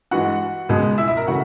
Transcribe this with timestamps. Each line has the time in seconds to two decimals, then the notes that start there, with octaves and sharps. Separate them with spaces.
0.11 G2 E3 G#3 F#4 F#5
0.69 C#2 B2 G#3
0.98 E4 E5
1.08 E4 E5
1.17 A#4 A#5
1.27 C#3 E3 A3 F#4 F#5